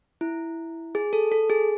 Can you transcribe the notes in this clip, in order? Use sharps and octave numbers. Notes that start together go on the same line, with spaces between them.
E4
G#4
A4
A4
G#4